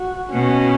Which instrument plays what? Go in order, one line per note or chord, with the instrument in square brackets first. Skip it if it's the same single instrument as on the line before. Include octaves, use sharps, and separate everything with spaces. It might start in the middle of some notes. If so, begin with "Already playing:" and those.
Already playing: [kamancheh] F#4
[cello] B2 [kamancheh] C#4